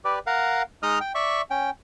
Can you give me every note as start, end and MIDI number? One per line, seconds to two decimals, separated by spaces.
0.05 0.19 67
0.05 0.19 71
0.05 0.19 74
0.27 0.62 70
0.27 0.62 77
0.27 0.62 78
0.83 0.99 56
0.83 0.99 63
0.83 0.99 75
0.83 0.99 82
0.83 0.99 87
0.83 0.99 89
1.00 1.12 79
1.15 1.42 74
1.15 1.42 76
1.15 1.42 85
1.50 1.70 61
1.50 1.70 79